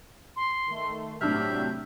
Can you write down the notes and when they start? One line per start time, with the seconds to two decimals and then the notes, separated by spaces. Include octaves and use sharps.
0.36 C6
0.67 D#3 A3
1.21 A2 C3 F#3 D4 G4 E5 F6 G6